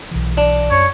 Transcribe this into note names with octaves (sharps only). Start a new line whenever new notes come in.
B1 B2 E3
D4
F#2 C#5